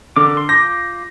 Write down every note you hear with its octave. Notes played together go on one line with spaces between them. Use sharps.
D3 A#4 D6
C6
F4 D6 G6 A#6